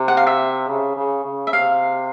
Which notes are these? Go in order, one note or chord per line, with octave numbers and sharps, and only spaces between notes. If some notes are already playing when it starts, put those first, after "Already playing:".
Already playing: C3
F#5
F5
E5
C#3
C#3
C#3
E5
C3 F5